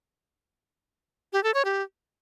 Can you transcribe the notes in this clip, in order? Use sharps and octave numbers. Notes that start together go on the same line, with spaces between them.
G4
A4
C#5
G4